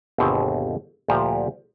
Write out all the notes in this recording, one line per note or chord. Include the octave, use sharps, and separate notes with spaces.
G1 D#2 B2 C4 G#4 E5
D2 A#2 F3 G4 A5 A#5